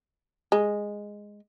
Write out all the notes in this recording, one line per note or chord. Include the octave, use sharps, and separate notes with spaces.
G#3